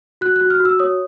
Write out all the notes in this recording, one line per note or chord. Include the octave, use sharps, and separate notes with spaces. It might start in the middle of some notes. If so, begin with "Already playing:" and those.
F#4 F#6
F#6
F#4
F6
F#4
E6
C#5 D#6